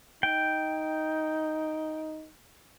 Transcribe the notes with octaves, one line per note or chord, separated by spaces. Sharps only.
D#4 G5